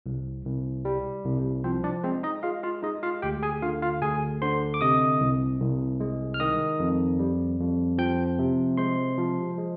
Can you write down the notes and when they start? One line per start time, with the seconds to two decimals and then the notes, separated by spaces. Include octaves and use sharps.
0.06 C2
0.45 C2
0.85 G3
1.25 C2
1.64 F3 C4 C5
1.84 D4 D5
2.04 G#3 C4 C5
2.23 D#4 D#5
2.43 G#3 F4 F5
2.63 F4 F5
2.83 G#3 D#4 D#5
3.03 F4 F5
3.22 D2 G4 G5
3.43 G#4 G#5
3.62 D3 F4 F5
3.82 F4 F5
4.02 D2 G#4 G#5
4.42 D3 C5 C6
4.74 D6
4.81 C3 D#5 D#6
5.20 C2
5.60 C2
6.00 G#3
6.34 F6
6.40 D#3 D#5 D#6
6.80 F2
7.19 G3
7.60 F2
7.98 F3 G5 G6
8.39 C3
8.77 G#3 C5 C6
9.18 F3
9.58 G#3